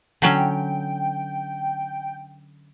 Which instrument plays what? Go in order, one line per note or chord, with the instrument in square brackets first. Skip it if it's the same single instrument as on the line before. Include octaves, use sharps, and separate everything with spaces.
[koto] D3 F#3 C#4 [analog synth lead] G5